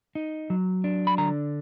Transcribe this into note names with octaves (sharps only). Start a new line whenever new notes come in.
D#4
F#3
D4
B5
D3 A#5